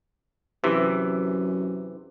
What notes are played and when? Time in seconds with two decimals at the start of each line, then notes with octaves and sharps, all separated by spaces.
0.64 F#2 C3 E3